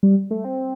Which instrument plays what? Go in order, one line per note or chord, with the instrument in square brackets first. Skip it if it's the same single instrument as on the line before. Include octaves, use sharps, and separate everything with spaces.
[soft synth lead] G3
A3
C4